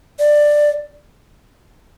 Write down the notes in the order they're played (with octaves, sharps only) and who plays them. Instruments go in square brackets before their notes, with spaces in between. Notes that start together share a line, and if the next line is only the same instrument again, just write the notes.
[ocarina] D5